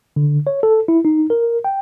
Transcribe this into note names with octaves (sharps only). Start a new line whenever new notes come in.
D3
C#5
A4
E4
D#4
A#4
G5